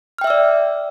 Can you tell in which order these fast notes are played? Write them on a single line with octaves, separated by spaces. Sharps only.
F6 G5 E5 E6 D5